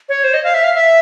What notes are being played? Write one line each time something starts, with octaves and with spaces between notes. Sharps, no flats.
C#5
C5
D#5
F5
E5
F5
E5